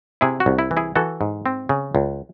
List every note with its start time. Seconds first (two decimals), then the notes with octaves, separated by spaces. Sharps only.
0.21 C3 E4 G#4
0.40 F#4
0.46 C2
0.59 E4
0.71 E3
0.77 E4 G#4
0.96 E3 F#4 A4
1.21 G#2
1.46 C4
1.69 C#3
1.95 C#2